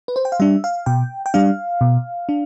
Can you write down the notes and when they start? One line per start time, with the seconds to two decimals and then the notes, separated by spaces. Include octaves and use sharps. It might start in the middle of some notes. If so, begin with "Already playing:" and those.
0.08 B4
0.16 C5
0.25 G5
0.32 F5
0.40 G3 D4 E5
0.64 F5
0.86 B2 G5
1.26 G5
1.34 G3 D4 F5
1.81 B2
2.29 D4